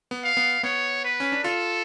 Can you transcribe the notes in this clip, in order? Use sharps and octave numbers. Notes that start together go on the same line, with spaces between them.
B3
F5
B3
B3 C#5
B4
C#4
D4
F4 A4